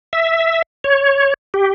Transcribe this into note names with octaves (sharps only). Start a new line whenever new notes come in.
E5
C#5
G4